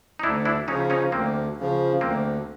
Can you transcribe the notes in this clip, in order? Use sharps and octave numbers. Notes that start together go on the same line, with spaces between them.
D#4
D2 D4 E4
D4 E4
C#3 F3 C#4 D#4
C#4 D#4
D2 A#3 C4
C#3 F3
D2 A#3 C4